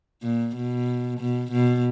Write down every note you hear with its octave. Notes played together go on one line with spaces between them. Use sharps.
A#2
B2
B2
B2